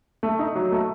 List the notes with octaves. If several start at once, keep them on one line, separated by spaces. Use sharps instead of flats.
A3
D#4
F#3
A3